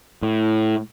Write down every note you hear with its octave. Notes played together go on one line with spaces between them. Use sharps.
A2